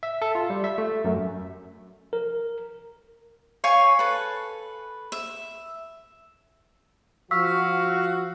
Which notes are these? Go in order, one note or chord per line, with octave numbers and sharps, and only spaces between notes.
E5
A4
F4
G3
E5
A3
F#2
A#4
C#5 F5 G#5 C#6
A4 B4
E5
F3 F#4 F5 C#6 E6 B6